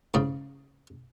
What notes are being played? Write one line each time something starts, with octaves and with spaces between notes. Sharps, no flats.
G#2 C#3